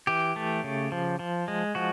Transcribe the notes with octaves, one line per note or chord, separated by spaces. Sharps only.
E3 G4
A3
C#3
F3
F3
G#3
F3 F#4